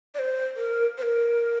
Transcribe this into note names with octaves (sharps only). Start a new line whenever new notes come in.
D5
C5
A#4
C5
A#4